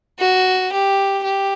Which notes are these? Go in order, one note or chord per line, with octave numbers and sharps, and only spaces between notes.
F#4
G4
G4